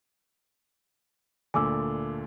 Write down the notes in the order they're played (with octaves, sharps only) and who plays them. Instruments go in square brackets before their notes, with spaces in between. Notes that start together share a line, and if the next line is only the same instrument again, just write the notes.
[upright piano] D2 A#2 D3 [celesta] G#5 D6 E6